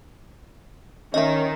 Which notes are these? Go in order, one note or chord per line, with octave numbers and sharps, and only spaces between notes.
D#3 C#4 D#5 E5